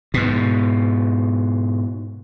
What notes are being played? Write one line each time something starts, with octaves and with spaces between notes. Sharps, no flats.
G#2 B2